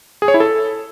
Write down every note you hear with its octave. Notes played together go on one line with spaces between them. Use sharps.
G#4
C#5
E4
A4